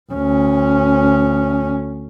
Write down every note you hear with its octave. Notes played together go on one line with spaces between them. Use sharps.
D2 C#4